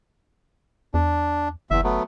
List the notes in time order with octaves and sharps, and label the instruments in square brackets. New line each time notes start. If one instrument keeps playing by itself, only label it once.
[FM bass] E2 [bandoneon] D4
[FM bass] F#1 [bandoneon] E2 E5
[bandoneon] F#3 A3 B3